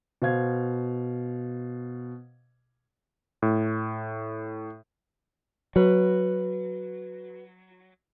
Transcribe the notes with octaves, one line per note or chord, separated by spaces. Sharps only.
B2 C5 F5 G#6
A2
F#3 F#4 B4